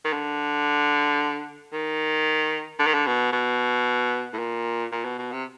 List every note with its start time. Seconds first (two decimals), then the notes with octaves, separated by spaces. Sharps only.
0.05 D#3
0.13 D3
1.73 D#3
2.79 D3
2.87 D#3
2.94 D3
3.07 B2
3.33 B2
4.33 A2
4.39 A#2
4.92 A#2
5.05 B2
5.18 B2
5.32 C3